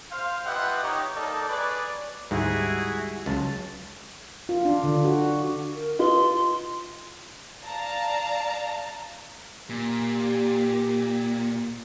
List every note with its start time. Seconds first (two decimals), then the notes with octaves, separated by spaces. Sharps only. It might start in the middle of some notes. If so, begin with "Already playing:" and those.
0.11 C5 F5
0.46 F4 G4 B4 D#5 E5 F#5
0.83 D#4 G4 C#5
1.15 A#3 D#4 A4 D5
1.48 G#4 B4 C#5 D5
2.31 D2 G#2 G3 G#3 E4 F#4 G#4
3.26 C#2 F#3 G#3 C#4 A5
4.49 F4
4.65 D4
4.84 D3
5.05 F#4
5.74 A#4
5.99 F4 B4 D#5 C6
7.63 D5 F5 A5 A#5
9.70 A#2 G4